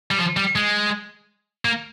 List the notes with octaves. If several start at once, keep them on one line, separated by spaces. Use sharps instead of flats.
G3
F3
G3
G#3
A#3